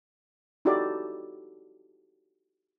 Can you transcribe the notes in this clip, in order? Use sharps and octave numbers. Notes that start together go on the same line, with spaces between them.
D#4 E4 F#4 G4 A4 D5